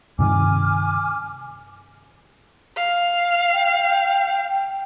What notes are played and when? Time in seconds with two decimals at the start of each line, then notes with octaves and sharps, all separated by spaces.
0.19 G2 C3 D#3 G#5 D6 F6
2.77 F5
3.53 G5